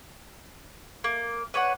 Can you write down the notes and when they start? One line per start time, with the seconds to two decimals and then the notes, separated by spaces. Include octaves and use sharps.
1.04 A#3
1.54 B4 C#5 D5 F#5